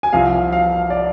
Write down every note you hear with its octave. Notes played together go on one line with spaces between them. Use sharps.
G#5
C2 C3 F3 F5
F5
D5